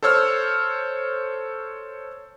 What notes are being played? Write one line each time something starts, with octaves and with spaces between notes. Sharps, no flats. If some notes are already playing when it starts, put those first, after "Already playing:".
A4 C5 C#5 E6 F6